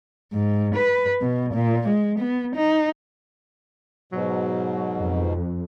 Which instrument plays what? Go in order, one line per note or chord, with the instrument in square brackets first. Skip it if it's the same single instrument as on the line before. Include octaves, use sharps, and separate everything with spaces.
[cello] G#2
B4
B2
A#2
G#3
B3
D#4
[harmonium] G#2 B2 [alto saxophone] F#3
[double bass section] F2